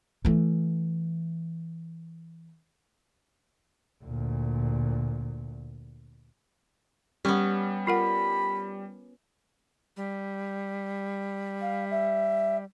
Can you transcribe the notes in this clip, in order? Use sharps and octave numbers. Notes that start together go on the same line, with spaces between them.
E3 A3
D2 A#2
G3 B3 C#4
F4 A#4 F#5 B5
G3
F5
E5